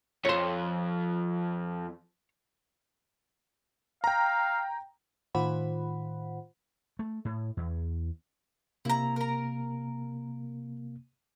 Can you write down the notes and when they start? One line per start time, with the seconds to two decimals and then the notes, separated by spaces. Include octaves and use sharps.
0.25 F2 C#5 C6
4.04 F5 G5 A#5
5.35 A2 D#3 F4 C5 F#5 B5
6.99 A3
7.25 A2
7.57 E2
8.85 C3 A#3 E4 A#5
9.16 A#4 A#5